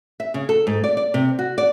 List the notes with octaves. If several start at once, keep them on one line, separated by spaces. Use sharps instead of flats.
E5
C#3
A4
G#2
D5
D5
C3
F#4
D5